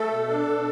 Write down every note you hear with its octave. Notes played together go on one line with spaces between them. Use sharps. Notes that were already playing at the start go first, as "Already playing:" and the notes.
Already playing: A3 A4
B2
D4
B2